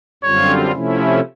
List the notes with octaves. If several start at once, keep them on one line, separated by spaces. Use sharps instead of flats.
F#2 D3 G3 C4 F4 C#5
C3 F3 A3 C#4 E4